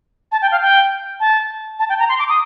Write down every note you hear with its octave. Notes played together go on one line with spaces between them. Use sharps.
A5
G5
F5
G5
A5
A5
G5
A#5
C6
D6
D#6